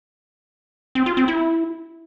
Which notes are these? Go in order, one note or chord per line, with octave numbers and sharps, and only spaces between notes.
C4
F4
C4
E4